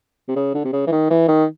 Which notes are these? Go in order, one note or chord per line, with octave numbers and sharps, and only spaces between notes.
C3
C#3
D3
C3
C#3
E3
D#3
E3
D#3